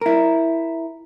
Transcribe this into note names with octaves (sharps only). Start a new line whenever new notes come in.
E4 A#4